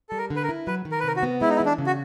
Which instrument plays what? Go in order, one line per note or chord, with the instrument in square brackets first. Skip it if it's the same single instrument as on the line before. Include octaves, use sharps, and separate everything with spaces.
[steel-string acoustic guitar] G3 [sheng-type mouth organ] A4
[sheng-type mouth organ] A#4
[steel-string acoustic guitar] D3
[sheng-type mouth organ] B4
A#4
[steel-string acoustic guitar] E4
[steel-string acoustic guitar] F#3 [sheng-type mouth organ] B4
[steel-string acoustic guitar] D#3
[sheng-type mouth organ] A#4
B4
[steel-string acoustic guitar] C3 [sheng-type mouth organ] A#4
[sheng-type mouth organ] F#4
[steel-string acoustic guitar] B3
[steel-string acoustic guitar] G#3 [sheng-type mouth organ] E4
[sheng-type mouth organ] D#4
E4
[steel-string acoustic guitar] E3
[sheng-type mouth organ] D4
[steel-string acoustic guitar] C#3
[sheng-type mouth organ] F#4